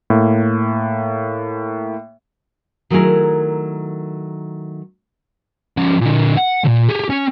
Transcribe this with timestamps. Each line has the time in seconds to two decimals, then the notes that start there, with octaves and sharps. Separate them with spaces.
0.10 A2 A#3
2.90 D#3 F#3 A3 E4 G#4 A#4
5.77 F3 C#4
6.01 A#2 D3
6.37 F#5
6.64 D2 A#2
6.89 G4 G#4
7.10 C#4